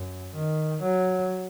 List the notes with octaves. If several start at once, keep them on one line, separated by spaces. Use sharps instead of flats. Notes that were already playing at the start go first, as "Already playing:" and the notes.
Already playing: F#2
D#3
F#3